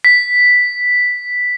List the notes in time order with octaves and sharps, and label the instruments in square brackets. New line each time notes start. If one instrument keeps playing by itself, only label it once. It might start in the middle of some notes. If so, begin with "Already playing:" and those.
[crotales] B6